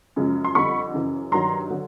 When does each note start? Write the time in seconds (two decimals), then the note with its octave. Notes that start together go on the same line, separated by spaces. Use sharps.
0.16 F#2 C#3 F3 G#3
0.45 C6
0.55 F2 D3 G3 B5 C#6
0.94 F#2 C#3 E3
1.32 G2 D#3 F#3 A#5 C6
1.70 D3 F#3